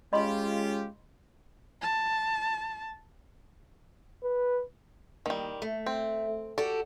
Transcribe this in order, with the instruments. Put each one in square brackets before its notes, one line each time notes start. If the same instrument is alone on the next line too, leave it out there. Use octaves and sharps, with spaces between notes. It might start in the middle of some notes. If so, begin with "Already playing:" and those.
[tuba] G#3 [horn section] C#4 F4 G4 [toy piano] D#5 B5 C6
[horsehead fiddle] A5
[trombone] B4
[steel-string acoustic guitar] D#2 [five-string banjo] D#3 G3
[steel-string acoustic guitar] A3
[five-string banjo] C4
[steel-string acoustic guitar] F#4 G4 A4 [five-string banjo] D5